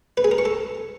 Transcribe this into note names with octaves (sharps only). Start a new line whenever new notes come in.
B4
G#4
A#4
C#6
A4